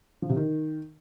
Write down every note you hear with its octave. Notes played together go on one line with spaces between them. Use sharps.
F3
C3
D#3